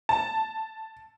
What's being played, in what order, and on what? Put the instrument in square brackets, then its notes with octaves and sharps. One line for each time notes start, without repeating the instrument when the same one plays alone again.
[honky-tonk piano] A5